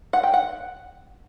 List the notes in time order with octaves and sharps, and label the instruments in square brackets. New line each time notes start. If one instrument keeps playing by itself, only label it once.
[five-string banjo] F#5
G5
F#5